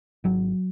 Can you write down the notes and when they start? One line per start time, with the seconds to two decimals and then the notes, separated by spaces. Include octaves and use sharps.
0.24 G#1 F#3